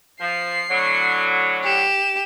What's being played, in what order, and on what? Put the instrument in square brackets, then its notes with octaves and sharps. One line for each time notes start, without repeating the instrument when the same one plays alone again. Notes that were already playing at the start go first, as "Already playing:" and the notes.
[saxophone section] F3 [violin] C7
[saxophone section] A2 D3 F#3
[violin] G4 E7